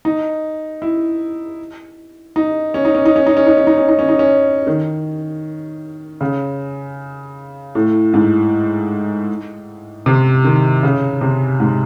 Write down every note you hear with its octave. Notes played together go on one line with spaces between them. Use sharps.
D#4
E4
D#4
C#4
D#4
C#4
D#4
C#4
D#4
C#4
D#4
C#4
D#4
C#4
D#4
C#4
D#4
C#4
D#3
C#3
A2
G#2
C3
D#3
C#3
C3
G#2